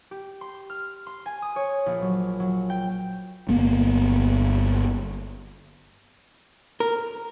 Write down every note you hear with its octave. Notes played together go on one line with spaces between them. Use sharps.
G4
C6
F6
C6
G#5
D#6
C#5
A#1
F#3
F#3
G5
G1 A#3 B3
A#4